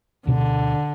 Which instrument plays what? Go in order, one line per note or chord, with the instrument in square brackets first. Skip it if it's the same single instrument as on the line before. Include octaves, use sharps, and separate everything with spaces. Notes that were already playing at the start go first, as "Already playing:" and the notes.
[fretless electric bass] D2 B2 D4 [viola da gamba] D3